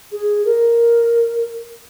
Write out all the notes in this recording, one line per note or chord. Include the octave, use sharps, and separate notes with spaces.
G#4
A#4